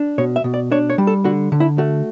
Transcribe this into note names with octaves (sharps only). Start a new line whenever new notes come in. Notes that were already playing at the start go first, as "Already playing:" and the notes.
Already playing: D4
B2 C#5
E5
B2
D5
D4 C#5
C#5
G3
A4
D3 F#4
D3
E4
A3 F#4